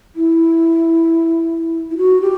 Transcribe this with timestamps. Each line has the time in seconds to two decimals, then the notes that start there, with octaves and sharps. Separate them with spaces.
0.16 E4
1.91 E4
1.97 F#4
2.22 G4